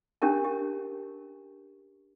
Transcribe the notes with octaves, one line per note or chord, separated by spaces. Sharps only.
C#4 D4 G4 A#4 A5
G4